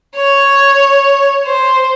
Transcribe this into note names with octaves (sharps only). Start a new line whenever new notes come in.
C#5
C5